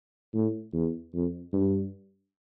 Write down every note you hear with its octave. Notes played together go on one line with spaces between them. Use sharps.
A2
E2
F2
G2